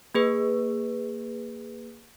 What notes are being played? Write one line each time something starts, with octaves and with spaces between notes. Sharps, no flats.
A#3 G#4 B4